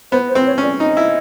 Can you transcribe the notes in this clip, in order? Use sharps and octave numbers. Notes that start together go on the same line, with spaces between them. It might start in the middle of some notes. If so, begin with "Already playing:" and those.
B3 C5
C5
C4
C#5
C#4 D5
D#4 D#5
E4